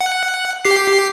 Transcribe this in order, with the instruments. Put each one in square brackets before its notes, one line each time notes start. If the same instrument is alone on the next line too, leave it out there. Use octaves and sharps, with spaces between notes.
[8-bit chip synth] F#5
G4 C7